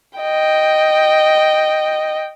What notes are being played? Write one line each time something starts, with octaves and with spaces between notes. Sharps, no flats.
D#5 G5